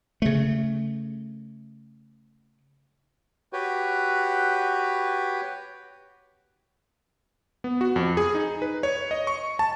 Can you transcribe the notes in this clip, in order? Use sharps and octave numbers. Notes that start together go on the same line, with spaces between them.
C#3 A3
F#4 G4 B4 C#5
B3
F#4
F2
G#4
D#4
B4
C#5
D#5
C#6
A5